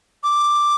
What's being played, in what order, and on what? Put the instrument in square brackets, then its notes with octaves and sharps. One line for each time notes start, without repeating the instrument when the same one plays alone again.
[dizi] D6